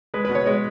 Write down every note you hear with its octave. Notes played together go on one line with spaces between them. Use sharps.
G#3 B4
B2 B4
C#5
G#3 C#5